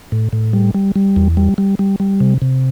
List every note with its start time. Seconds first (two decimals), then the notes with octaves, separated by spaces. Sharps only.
0.12 A2
0.33 A2
0.53 G3
0.74 G3
0.96 G3
1.16 E2
1.37 G3
1.58 G3
1.79 G3
2.00 G3
2.20 C3
2.42 C3